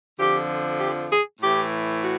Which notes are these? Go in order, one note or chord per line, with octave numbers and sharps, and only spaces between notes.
F2 D3 F3 G4
G4
G#4
A2 E3 G4
F#4